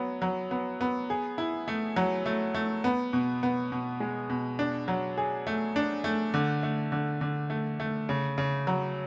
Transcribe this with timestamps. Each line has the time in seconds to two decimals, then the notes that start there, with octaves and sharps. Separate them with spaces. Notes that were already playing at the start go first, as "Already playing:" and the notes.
Already playing: F#3 B3
0.22 F#3
0.51 B3
0.81 B3
1.10 G#4
1.38 E4
1.68 A3
1.96 F#3
2.26 A3
2.54 A3
2.84 B3
3.13 B2
3.43 B3
3.72 B2
4.00 G#3
4.30 B2
4.59 D4
4.88 F#3
5.17 G#4
5.47 A3
5.76 D4
6.04 A3
6.34 D3
6.63 A3
6.92 D3
7.21 D3
7.50 A3
7.80 A3
8.09 C#3
8.38 C#3
8.67 F#3